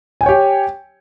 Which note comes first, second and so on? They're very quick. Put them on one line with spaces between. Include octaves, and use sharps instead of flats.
G#5 G5 C#5 G4